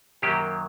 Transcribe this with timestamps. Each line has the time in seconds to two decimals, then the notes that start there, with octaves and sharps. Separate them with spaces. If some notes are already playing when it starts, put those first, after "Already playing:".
0.22 F#2 D#3 F#3 A#3 G4